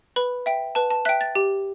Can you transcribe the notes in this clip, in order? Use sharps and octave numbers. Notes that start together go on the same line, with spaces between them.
B4 B5
E5 G5
B4 A5
A5
E5 G5 F#6
A6
G4